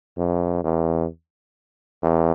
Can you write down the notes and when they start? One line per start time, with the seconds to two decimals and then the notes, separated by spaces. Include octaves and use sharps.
0.18 F2
0.64 E2
2.03 E2